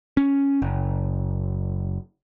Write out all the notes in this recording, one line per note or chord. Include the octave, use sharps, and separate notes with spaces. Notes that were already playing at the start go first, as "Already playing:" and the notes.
C#4
F#1